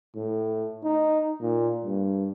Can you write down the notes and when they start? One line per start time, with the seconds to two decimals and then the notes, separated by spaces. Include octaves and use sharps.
0.15 A2
0.83 D#4
1.41 A#2
1.85 G2